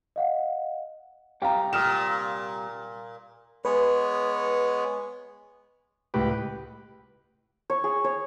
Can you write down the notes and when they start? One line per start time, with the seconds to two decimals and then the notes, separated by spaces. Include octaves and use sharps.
0.16 D#5 F5 F#5
1.42 C2 G4 F5 G5 A#5
1.73 A#2 D#6 F6 E7
3.65 G#3 B3 B4 C#5
6.14 C#2 A2 G4 B4
7.70 C#5
7.84 G#4
8.04 C#5